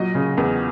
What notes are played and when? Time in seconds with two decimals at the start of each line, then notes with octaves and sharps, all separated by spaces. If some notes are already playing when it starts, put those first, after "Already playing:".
Already playing: A#2 F#3 D#5
0.15 C#3
0.38 E2